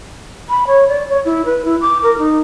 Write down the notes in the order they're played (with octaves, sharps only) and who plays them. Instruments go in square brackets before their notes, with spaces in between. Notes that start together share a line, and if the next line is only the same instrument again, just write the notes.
[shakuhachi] B5
C#5
D5
C#5
E4
B4
E4
D6
A#4
D#4